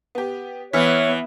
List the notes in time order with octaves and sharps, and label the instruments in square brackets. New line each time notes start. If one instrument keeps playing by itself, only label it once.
[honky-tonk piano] B3 G4
[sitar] E3 [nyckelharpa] B3 [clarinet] C#5 [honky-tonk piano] E5 F6 B6